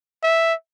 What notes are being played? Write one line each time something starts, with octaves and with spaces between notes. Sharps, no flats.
E5